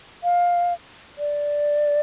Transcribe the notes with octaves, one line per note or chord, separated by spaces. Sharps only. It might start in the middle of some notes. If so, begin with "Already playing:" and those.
F5
D5